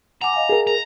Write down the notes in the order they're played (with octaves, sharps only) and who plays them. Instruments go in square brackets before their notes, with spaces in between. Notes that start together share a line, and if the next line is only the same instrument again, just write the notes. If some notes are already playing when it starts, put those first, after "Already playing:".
[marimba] F#5 G#5 D6 [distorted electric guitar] A#5
[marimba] D#5 F5 G#5
[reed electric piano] G#4 A#4
[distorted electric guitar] A#5